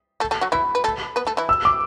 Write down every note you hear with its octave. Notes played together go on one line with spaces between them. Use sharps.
A3 A4
A3 A4
F#3 F#4
E3 E4 B5
B4
A3 A4
B3 B4
A3 A4
E3 E4
E6
D6